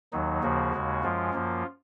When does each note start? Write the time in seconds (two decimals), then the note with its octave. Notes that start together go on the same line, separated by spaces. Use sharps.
0.12 D#2 D#3 F#3 D#4
0.43 D#2 C#3 F3 A#3 F#4
0.73 D#2 C#3 G#3
1.03 F#2 F3 G#3 F4
1.33 F#2 F3 A#3